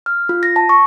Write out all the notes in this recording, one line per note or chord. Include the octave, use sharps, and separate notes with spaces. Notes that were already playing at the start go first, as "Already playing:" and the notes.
F6
F4
A#6
A5
C#6